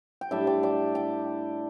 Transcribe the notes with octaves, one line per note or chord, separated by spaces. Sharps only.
G5
A2 G3 D4 E5 A5
D5 G5
D5 G5
D5 G5